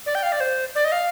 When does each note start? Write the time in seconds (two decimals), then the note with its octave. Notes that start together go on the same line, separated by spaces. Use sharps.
0.06 D5
0.15 G5
0.23 F5
0.32 D5
0.40 C5
0.75 D5
0.85 D#5
0.92 F5